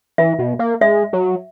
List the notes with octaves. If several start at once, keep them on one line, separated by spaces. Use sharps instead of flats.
E3 E5
B2
A#3
G#3 E5
F#3